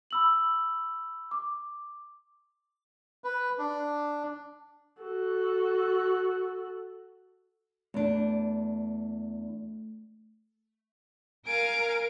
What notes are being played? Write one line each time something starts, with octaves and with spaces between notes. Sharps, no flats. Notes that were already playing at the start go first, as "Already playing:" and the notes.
B5 E6 F#7
D6
B4
D4
F#4 A4
E2 A3 D4
A#4 F5 G#5 D7